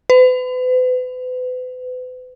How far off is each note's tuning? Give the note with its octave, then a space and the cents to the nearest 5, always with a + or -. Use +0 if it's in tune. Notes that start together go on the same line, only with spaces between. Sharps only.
B4 +40